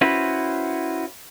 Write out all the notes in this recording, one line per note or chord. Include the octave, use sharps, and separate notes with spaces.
C#4 E4 F#4 B4 C5